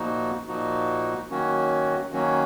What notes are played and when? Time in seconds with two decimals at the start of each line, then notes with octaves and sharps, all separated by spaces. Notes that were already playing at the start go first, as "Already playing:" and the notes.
Already playing: A#2 F3 A#3 D#4 F#4
0.48 A#2 F3 A#3 D#4 F#4
1.29 D#3 F#3 A#3 C#4 F#4
2.12 D#3 F#3 A#3 C#4 F#4